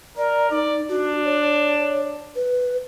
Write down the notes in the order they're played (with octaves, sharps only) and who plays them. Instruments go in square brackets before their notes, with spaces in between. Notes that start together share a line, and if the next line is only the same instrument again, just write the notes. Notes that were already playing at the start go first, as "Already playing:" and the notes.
[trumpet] A#4 [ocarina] D5
[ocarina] D#4 [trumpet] D5
[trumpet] D4 [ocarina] F#4
[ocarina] C#5
B4